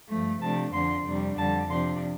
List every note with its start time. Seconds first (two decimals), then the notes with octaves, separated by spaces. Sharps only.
0.09 G2 F3 A3
0.41 C3 F3 A3 D4 A5
0.73 F2 D3 F3 D4 C6
1.06 F2 C3 G3 D4
1.37 F2 D3 G3 A5
1.69 C3 F3 D4 C6